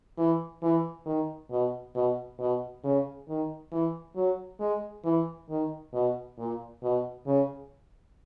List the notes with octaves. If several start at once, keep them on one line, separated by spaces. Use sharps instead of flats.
E3
E3
D#3
B2
B2
B2
C#3
D#3
E3
F#3
G#3
E3
D#3
B2
A#2
B2
C#3